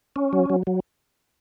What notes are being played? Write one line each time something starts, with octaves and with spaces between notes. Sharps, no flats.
C#4
F#3
F#3
F#3